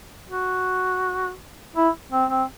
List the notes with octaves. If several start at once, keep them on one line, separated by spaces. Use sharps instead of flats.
F#4
E4
C4
C4